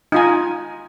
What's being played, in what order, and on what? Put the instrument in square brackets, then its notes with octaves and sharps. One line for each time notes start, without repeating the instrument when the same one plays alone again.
[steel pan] D#4 F4 G#5